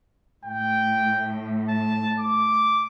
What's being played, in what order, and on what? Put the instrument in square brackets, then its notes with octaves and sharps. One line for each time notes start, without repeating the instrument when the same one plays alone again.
[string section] A2 [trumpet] G5
[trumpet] A5
D6